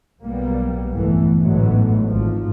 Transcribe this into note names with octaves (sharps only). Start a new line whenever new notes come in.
B1 G3 A#3 B3
G1 F2 A#2 E3 A3 B3
A1 G#2 D3 F#3 A3 B3
G#1 F3